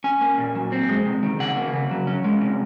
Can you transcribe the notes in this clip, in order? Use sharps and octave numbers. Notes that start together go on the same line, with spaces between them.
C#4 G#5
A#3
A#2
F#3
C4
G#3
C3
D#3
C#3 F#5
A#3
C#3
F#3
C#4
G#3
C3